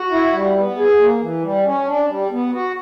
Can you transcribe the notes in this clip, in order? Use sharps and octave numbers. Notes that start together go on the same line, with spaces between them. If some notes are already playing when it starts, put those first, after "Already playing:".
Already playing: F#4
E4
G3
B3
G#4
A#3
E3
G3
C#4
D4
G3
B3
F#4